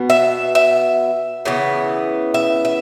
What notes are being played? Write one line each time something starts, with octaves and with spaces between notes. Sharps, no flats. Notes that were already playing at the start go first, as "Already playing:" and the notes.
Already playing: B2 B3
E5
E5
C#3 E3 B3
E5
E5